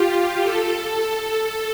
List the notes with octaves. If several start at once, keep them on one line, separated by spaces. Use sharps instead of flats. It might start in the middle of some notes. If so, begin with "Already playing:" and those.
Already playing: F4 G4
A4